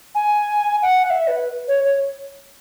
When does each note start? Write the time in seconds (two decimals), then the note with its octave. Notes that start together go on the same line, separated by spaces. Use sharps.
0.15 G#5
0.82 F#5
1.05 F#5
1.10 E5
1.28 B4
1.68 C#5
1.84 C#5